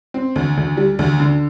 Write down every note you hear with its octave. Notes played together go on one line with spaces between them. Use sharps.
C4
D2
D2
G3
D2
D3